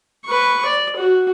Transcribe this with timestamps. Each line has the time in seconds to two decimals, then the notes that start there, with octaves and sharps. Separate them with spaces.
0.25 B4 C#6
0.65 D5
0.96 F#4